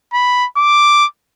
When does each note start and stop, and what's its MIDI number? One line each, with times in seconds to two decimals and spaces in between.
0.13 0.46 83
0.57 1.06 86